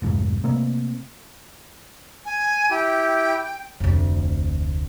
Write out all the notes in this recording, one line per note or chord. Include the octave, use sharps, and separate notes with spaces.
F1 C2 F2 G#2
C3 A3 A#3 C4
G#5
E4 G4 G5
F1 D2